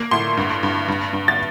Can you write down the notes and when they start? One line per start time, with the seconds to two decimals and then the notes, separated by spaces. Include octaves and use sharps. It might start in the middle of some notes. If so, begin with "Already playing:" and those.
Already playing: A#3
0.11 A2 C6
0.37 G2
0.63 G2
0.88 G2
1.13 G2
1.28 A6